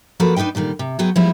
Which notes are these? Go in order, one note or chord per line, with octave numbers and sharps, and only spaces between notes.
F3 A#3 F#4 A4 B4
D4 D#4 F#4 B4 G5
A#2 D3 D#3 G3
C3
F#3 B3 F#4 G#4 G5
F3 G3 G#3 B3 E4